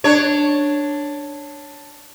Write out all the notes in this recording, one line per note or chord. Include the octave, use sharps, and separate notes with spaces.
D4 C#5